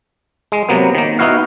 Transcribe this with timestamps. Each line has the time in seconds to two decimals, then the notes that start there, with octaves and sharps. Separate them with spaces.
0.52 G#3
0.69 C3 F#3 A#3 B3
0.95 D#3 A#3
1.19 B3 D#4 E4 F#4 F5